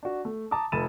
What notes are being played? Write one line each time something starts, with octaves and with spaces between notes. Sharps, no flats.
D4 F#4
A3
A5 A#5 D6 D#6
F1 A4 B5 A6 D#7 E7